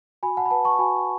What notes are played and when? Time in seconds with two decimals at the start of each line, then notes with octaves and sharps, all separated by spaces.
0.23 F#4 G#5 B5
0.37 F#5 A5
0.46 B5
0.51 B4 F#5 A5
0.65 A5 C#6
0.79 F#4 G#5 B5